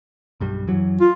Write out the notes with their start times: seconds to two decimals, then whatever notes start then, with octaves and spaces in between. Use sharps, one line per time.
0.40 B1 G2 G3
0.67 F#2 E3 F#3
1.01 F4